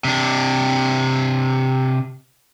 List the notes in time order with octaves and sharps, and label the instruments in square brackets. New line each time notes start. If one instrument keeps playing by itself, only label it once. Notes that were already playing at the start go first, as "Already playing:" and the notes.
[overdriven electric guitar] C3 D4